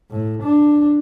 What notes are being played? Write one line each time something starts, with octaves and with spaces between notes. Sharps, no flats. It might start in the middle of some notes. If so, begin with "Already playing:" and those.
A2
D4